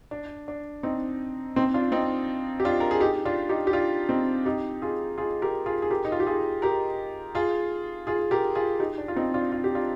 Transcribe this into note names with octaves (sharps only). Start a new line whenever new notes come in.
D4
D4
C4 D#4
C4 D#4
D4 F4
C4 D#4
G4
D4 F4
A#4
G#4
D#4 G4
D4 F4
D#4 G4
G4
D4 F4
C4 D#4
D#4 G4
F4 G#4
F4 G#4
G4 A#4
F4 G#4
G#4
G4 A#4
D#4
F4
G4
F4 G#4
G4 A#4
F4 G#4
F4 G#4
G4 A#4
F4 G#4
D#4 G4
D4
F4
C4 D#4
D4 F4
F4
G4
D4 F4